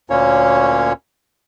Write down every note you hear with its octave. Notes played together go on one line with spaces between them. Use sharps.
D2 A#2 A#3 C#4 C#5